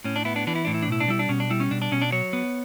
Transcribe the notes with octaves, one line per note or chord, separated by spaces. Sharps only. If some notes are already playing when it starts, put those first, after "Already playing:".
A2 C#4
D4
B3 E4
D4
E3 D4
E4
A2 D4
E4
D4
B2 E4
D4
G3 E4
D4
B2 C#4
D4
G3 E4
C#4
B2 D4
D4
B2 C#4
D4
F#3 C#5
B3